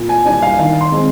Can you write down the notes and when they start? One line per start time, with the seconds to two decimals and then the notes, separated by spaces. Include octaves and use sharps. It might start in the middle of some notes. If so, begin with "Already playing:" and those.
Already playing: A#2
0.09 G#5
0.26 G3 D4 G#5
0.42 F5
0.59 D#3 F5
0.81 C6
0.92 G#3 C4